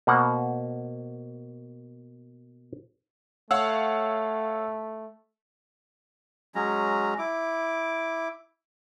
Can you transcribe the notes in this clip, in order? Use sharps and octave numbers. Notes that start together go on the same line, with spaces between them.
B2 A#3 C5 F#5
A3 C#5 F5 F#5 E6
F#3 G#3 C#4 A#5
E4 D6